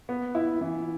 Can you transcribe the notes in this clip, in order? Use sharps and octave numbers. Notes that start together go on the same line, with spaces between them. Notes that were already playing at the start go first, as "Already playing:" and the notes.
B3
E4
E3